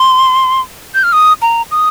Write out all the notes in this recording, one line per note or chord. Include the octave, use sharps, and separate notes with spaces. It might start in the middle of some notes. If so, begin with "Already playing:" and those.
Already playing: C6
G6
F6
D#6
A#5
D#6